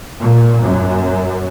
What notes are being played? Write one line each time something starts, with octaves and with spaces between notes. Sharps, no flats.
A#2
F#2